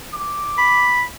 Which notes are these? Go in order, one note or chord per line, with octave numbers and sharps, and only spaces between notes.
D6
B5